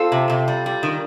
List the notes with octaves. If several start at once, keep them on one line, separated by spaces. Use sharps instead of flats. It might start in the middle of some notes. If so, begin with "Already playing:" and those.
Already playing: C4 F4 A4
C3
C3
G3
G3
D#3